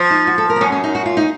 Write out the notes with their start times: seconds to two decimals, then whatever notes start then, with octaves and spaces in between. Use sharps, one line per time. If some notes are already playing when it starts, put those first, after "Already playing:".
Already playing: F3
0.11 D#4
0.27 F#4
0.38 A4
0.50 A#4
0.56 C4
0.61 F#2 C#4
0.72 C#4
0.84 D#4
0.95 F#4
1.06 F4
1.17 D#4